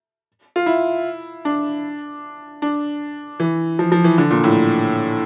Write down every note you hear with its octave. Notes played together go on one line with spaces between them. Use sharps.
F4
E4
D4
D4
E3
F3
F3
E3
D3
A#2
A2